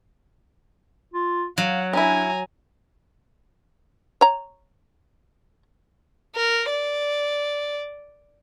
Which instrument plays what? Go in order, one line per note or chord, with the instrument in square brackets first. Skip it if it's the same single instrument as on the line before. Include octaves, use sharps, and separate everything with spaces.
[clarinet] F4
[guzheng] F#3 [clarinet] F5 [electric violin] F#5
[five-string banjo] C#4 E4 [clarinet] D4 [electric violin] G#5 A#5
[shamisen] C#5 A#5
[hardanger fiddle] A#4
D5